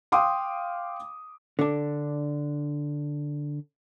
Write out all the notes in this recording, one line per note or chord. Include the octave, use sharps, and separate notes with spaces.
F5 G5 C6 D6 D#6
D3 D4